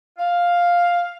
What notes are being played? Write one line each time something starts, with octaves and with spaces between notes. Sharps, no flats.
F5